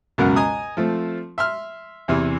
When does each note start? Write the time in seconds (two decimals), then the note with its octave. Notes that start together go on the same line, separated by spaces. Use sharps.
0.18 C#2 F#2 B2 A#4 F#5
0.36 D#5 G#5 A#5 D#6
0.77 F3 A3 C4
1.38 E5 C6 F6
2.08 E2 C3 E3